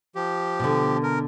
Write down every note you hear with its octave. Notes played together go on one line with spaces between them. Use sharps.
F3 G4
B2 D3
A#4